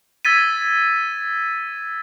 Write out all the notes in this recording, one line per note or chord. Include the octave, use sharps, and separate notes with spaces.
E6 G#6 A6 B6 D#7